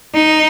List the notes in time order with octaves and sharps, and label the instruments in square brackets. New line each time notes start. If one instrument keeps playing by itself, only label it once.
[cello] D#4